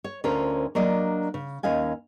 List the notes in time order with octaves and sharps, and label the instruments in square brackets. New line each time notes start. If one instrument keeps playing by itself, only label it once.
[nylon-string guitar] C#5
D2 C#4 F4 A#4 C5 C#5
F#3 A#3 D4 D5 D#5
C#3
D#2 C#4 D#5 F5 G#5